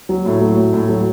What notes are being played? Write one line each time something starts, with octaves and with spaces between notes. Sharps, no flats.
F#3
A2
F#3
A2
A2
F#3